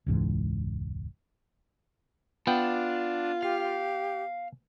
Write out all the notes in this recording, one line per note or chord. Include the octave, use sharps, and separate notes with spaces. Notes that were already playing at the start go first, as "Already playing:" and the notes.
E1 C#2 G#2 E3
B3 D4 F4 G5
G4 F5